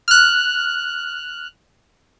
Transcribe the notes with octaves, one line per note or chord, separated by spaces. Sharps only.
F6 F#6